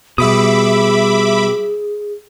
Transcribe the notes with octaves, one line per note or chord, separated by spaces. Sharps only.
B2 G3 G#4 E5 B5 D6 D#6